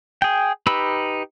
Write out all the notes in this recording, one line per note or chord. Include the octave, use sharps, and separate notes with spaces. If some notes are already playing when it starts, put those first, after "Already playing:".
G#4 G5
D#4 G4 B4 B5 E6